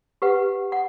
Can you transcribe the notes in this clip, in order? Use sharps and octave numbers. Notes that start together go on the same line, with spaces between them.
G4 B4 F#5
F#5